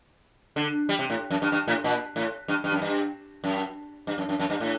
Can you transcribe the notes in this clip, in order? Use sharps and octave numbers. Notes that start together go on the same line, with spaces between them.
D3
G3
C3
A2
F#2
G2
G2
A2
A#2
A2
G2
G2
F#2
G2
F#2
G2
F#2
F#2
F#2
G2
A2